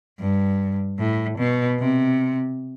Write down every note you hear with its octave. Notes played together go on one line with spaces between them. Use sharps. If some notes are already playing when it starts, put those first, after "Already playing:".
G2
A2
B2
C3